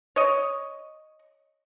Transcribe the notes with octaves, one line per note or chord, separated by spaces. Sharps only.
C#5 D#5